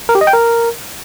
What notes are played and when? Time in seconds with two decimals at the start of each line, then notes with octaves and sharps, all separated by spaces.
0.09 A#4
0.15 G4
0.21 D#5
0.27 G5
0.33 A#4